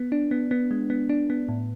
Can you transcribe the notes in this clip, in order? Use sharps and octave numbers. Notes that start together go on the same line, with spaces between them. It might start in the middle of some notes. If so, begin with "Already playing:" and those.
Already playing: B3
D4
B3
B3
G#3
B3
D4
B3
A2